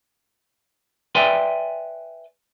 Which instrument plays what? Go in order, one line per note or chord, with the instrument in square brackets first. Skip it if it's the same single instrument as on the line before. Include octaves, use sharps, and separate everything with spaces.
[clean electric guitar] B4 D5 E5 G5 G#5 C6